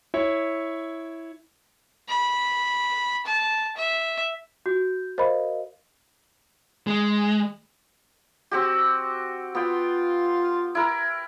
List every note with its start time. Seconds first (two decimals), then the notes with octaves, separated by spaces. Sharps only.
0.14 E4 C#5
2.09 B5
3.26 A5
3.77 E5
4.66 F#4 G6
5.18 A#4 C5 D#5 F5 B5
6.87 G#3
8.51 C4 F#4 G4
9.55 B3 F4 G5
10.75 E4 A#4